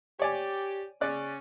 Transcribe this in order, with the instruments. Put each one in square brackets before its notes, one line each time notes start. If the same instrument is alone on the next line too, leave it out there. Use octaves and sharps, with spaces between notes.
[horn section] G4 [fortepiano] C#5 D5 G#5
[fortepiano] C#3 D5 F#6 [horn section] C#4